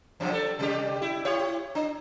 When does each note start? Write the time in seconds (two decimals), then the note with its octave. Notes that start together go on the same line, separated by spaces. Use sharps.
0.20 F#2 C3 F3
0.33 G3 A4
0.59 C3 G3 G4
1.02 E4
1.25 E4 G4 C#5
1.75 D4